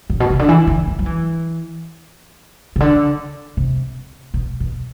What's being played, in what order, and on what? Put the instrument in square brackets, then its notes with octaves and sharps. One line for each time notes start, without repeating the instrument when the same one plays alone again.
[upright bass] A2
B2
C3
D3
E3
D3
E3
F#3
E3
C3
D3
C3
B2
B2